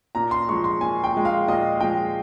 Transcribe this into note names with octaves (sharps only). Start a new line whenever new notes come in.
A#2 A#5
C6
F3 G#3 C#6
C6
A#2 G#5
G5
F3 G#3
F5
A#2 D#5
F3 G#3 G5